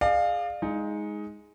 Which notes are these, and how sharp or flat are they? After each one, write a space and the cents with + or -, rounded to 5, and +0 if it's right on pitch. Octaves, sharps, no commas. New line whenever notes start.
G#4 +0 D5 +40 F5 +5
G#3 +0 D#4 +15